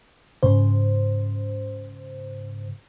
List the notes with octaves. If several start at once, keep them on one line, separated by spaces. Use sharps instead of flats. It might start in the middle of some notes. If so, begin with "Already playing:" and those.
G#2 C#3 C5